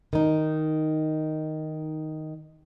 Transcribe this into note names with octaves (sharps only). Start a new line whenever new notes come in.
D#3 D#4